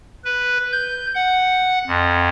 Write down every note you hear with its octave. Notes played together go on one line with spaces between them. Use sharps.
B4
G6
F#5
F2